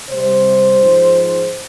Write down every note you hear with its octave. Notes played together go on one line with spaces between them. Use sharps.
C3 G3 C5
G#2 F3 G#3